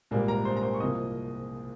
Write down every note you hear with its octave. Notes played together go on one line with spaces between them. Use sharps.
A#1 G#2 G3 A#3
A#4 A#5
C5 C6
A#5
C5 C6
C#6
C2 C3 F3 A#3 D#5 D#6